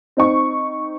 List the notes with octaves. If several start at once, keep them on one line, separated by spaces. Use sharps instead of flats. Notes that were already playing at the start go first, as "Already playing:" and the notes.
C4 D#4 C#6